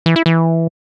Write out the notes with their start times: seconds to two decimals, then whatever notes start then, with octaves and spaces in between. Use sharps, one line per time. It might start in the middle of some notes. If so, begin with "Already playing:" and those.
0.06 E3
0.16 E4
0.26 E3